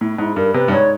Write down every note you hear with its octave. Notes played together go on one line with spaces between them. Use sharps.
A2 E4
G#2 E4
G2 A#4
C3 B4
G2
G#2 C#5